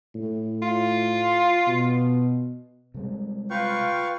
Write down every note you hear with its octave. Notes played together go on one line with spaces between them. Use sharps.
A2
F4
B2
C3 G3 G#3
F4 B4 F5 G5 C#6